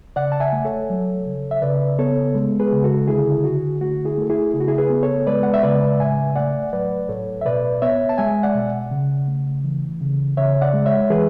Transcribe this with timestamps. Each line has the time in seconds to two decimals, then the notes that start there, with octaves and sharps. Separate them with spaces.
0.16 C#3 D5 F#5
0.32 A5
0.40 E5 G#5
0.53 A3
0.65 A4 C#5
0.90 F#3
1.26 C#3
1.51 E5
1.62 C#3 B4 D5
1.99 B3 A4 C#5
2.35 G#3
2.60 G#4 B4
2.72 C#3
2.84 F#4 A4
3.08 D3 E4 G#4
3.44 D3 F#4
3.81 A3 F#4
4.05 E4 G#4
4.17 A3 A4
4.30 E4 G#4
4.53 C#3 G#4
4.61 F#4
4.68 E4 G#4
4.78 G#4 B4
4.90 B3
5.03 A4 C#5
5.27 G#3 B4 D5
5.43 F#5
5.54 E5
5.63 C#3 B4 D5
6.00 A2 E5 G#5
6.36 A3 D5 F#5
6.73 F#3 B4 D5
7.09 A2 A4 C#5
7.41 E5
7.45 B2 B4 D5
7.82 B3 C#5 E5
8.09 A5
8.18 G#3 E5 G#5
8.43 D5 F#5
8.55 B2
8.91 C#3
9.28 A3
9.64 E3
10.01 C#3
10.37 C#3 C#5 E5
10.61 D5 F#5
10.74 G#3
10.86 C#5 E5
11.10 E3 G#4 B4